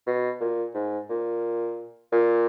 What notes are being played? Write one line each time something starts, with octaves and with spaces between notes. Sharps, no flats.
B2
A#2
G#2
A#2
A#2